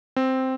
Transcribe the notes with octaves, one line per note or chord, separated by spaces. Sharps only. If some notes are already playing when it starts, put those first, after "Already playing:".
C4